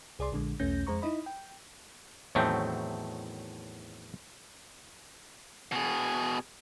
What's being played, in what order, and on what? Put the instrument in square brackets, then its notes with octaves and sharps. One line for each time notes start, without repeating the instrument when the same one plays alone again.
[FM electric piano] C2 G#4 D5 C6
A#1 D3 G#3
B1 E2 A3 C#4 G6 A#6
F2 G#3 C5 A#5 C#6
D#4 E4 D#5 B5
G5
[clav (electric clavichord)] E2 A2 D#3 F#3 A3 C4
[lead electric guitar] B2 G#4